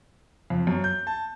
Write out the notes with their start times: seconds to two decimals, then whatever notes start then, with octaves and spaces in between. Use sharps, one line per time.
0.50 F2
0.67 F#2
0.84 G6
1.07 A5